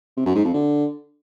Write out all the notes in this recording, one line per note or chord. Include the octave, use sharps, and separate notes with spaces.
C3
F#2
G#2
F2
D3